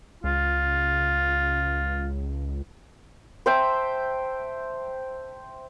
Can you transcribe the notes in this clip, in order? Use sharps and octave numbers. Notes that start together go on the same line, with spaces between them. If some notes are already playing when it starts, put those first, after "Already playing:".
C#2 F4
C5 E5 G5 A5